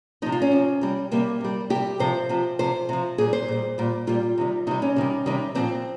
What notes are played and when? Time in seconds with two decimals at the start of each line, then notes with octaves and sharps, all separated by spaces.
0.22 F3 D#4
0.26 C3
0.32 F4
0.42 C#4
0.52 C3 F3
0.81 C3 G3
1.11 C3 G3 A#3
1.41 C3 G3
1.70 C3 G4
1.75 G3
2.00 C3 F3 C5
2.29 C3 F3
2.59 C3 F3 C5
2.89 C3 F3
3.18 A#2 G3 G#4
3.33 C5
3.48 A#2 G3
3.78 A#2 G3
4.07 A#2 G3 F4
4.38 C3 D#3 G3
4.67 C3 D#3 G3 D#4
4.82 C#4
4.96 C3 D#3 G3
5.26 C3 D#3 G3
5.55 A#2 F3 C4